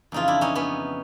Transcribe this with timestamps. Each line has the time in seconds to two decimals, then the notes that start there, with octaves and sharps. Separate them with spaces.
0.12 F2 C#3 E3 D#4 F4
0.28 D4 E4
0.41 C#4 D#4
0.55 B3 C#4